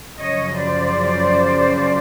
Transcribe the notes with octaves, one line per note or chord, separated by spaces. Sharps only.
F#2 C#3 F3 C#5 D#5
C5 D5